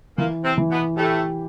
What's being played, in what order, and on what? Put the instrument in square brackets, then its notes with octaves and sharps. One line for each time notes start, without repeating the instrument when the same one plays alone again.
[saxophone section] A#2 A#3 [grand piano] E3
[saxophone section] C3 C4
[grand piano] E3
[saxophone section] B2 B3
[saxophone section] A2 A3 [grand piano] G4